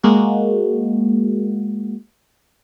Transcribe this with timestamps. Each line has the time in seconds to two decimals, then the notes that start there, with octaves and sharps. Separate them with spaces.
0.03 G#3 A#3 F#4